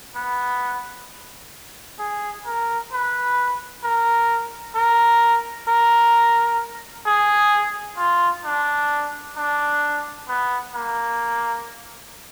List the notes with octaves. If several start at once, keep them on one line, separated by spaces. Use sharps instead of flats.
B3
G#4
A#4
B4
A#4
A#4
A#4
G#4
F4
D4
D4
B3
A#3